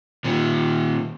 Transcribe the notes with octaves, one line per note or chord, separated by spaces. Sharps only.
A#2 D#3